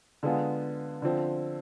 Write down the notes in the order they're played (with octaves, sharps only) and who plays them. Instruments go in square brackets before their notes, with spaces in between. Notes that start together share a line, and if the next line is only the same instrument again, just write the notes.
[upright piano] D3 G#3 B3 F4 G#4
D3 F3 C4